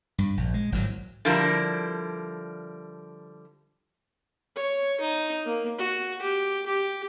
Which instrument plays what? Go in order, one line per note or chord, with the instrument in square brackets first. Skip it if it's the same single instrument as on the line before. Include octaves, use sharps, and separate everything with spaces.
[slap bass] G2
A#1
G#3
G#1 A2 F#3
[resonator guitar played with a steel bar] D3 F3 G3 E4 A#4
[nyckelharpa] C#5
D#4
A#3
F#4
G4
G4